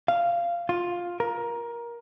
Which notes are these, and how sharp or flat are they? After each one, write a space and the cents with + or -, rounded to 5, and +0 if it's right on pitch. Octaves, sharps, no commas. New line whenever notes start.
F5 -15
F4 +10
A#4 +15